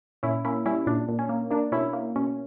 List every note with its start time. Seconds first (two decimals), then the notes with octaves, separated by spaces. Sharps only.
0.23 A#2 C#4 E4
0.45 A#3 C#4 E4
0.66 G3 C#4 E4
0.87 A#2 D4
1.09 A#2
1.19 C#4
1.29 A#3
1.51 A#3 D4
1.72 B2 C#4 E4
1.93 A#3
2.16 B2 C#4